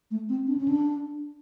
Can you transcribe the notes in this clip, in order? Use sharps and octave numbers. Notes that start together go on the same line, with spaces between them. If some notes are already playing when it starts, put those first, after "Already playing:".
A3
C4
D4
C#4
D4